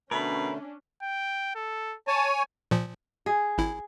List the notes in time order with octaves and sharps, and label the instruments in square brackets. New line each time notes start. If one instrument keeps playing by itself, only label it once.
[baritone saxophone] B2 [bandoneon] D3 A3 [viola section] C#4 D4 [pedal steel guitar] A#4 B5
[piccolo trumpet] G5
A4
[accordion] C#5 G#5 [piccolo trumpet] A5
[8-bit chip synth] A#2 F3
[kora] G#4
[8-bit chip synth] G#1 E4